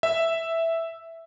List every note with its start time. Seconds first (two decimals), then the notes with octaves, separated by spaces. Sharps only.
0.03 E5